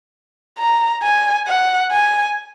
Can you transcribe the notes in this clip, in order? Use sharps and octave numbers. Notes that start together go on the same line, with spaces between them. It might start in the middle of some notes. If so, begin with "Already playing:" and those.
A#5
G#5
F#5
G#5